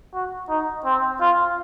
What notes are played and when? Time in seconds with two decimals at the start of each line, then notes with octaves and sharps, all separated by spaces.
0.14 F#4
0.49 D#4
0.85 C4
1.20 F4